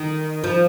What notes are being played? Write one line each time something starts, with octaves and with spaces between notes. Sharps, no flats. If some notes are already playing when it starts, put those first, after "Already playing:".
Already playing: D#3
F3